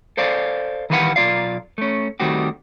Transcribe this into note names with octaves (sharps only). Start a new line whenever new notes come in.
A4 C5 D5 F5
D#3 E3 G4 B4 F5 F#5
B1 C#3 F4 D5 F5
A3 C#4
D#3 G3 A3 C4 F#4 G4